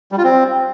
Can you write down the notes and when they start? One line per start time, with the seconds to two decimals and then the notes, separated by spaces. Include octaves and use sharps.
0.12 G3
0.18 F4
0.24 C4